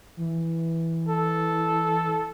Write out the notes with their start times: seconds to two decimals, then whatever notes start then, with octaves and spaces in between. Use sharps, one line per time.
0.17 E3
1.09 A4